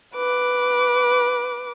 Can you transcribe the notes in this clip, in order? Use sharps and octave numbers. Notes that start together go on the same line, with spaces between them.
B4 D6